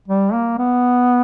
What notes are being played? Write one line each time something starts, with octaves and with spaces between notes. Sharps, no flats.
G3
A#3
B3